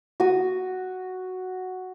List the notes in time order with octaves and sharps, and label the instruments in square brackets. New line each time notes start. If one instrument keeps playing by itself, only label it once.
[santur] F#4 D#6